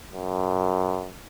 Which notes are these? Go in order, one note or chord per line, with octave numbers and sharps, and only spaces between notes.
F#2